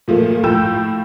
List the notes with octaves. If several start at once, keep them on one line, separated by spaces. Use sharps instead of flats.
A#2 F3 A3 A#3
A2 F3 G5 E6 G6 E7